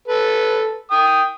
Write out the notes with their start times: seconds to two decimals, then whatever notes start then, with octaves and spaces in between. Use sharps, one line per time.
0.08 A4 B4
0.91 G5 D#6